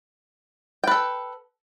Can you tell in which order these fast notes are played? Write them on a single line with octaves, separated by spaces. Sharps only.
G5 B4 A4